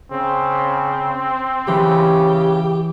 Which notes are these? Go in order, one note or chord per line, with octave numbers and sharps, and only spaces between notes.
C#3 C4
C#3 E3 G4